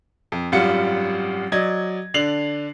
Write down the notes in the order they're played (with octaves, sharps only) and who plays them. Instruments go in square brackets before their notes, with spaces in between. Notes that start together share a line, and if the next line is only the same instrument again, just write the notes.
[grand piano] F2
G#1 F#2 G3 F4 F#5 C#7
F#3 D5 D#5 G#6
D3 D4 C7 F7 F#7